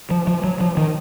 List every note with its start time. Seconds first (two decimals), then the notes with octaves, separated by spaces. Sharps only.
0.11 F3
0.27 F3
0.44 F#3
0.61 F3
0.77 D#3